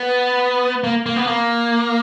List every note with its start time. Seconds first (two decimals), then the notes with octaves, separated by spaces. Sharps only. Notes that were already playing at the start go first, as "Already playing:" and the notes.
Already playing: B3
0.84 A#3
1.06 A#3
1.16 B3
1.27 A#3